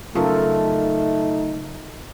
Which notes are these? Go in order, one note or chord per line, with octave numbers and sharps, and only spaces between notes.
F#2 C#3 A3 D#4 F4 A4 A#4